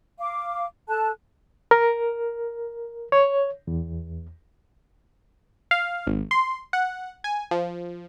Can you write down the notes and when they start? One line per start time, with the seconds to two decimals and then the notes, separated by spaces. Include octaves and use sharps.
0.20 F5 D6
0.88 A4 A5 F#6
1.71 A#4
3.12 C#5
3.67 E2
5.71 F5
6.07 G#1
6.31 C6
6.73 F#5
7.24 G#5
7.51 F3